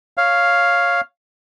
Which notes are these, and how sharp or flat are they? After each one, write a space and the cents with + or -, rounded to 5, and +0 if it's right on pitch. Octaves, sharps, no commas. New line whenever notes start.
C#5 +0 F5 +0